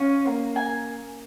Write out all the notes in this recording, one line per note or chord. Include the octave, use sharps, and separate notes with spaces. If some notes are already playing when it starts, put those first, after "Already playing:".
Already playing: C#4 F5
A#3
G#5